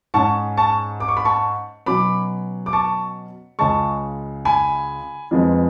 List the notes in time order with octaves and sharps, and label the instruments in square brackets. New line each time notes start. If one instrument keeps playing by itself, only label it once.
[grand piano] G#2 G#3 C#4 A5 C#6
A5 C#6
D6
C#6
B5
A5 C#6
B2 F#3 C#4 B5 D6
D6
A5 C#6
C#2 C#3 G#3 A5 C#6
G#5 B5
F2 F3 G#3 B3